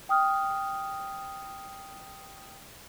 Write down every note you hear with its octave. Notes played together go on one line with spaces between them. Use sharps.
G5 D#6 F6